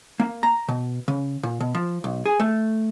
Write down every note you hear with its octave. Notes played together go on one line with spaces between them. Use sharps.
A#3
A#5
B2
C#3
A#2
B2
F3
B1
G#4
A3